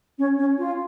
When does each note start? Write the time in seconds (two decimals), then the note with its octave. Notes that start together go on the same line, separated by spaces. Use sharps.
0.18 C#4
0.38 C#4
0.58 F4